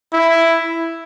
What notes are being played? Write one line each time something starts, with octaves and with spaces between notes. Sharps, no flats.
E4